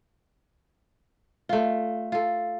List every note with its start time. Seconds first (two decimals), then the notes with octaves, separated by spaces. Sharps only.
1.49 A3 F4
2.12 F4 A4